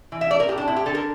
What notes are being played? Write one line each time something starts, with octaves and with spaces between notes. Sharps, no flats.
E3
E5
A3 D5
A#4
A2 G4
D4
C4 E4
G4
D3 A4
A#4